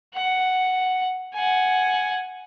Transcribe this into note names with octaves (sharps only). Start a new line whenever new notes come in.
F#5
F#5 G#5